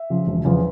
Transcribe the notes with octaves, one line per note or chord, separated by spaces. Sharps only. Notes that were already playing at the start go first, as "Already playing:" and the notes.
Already playing: E5
C#3 F3
E1
E2 C#3 F3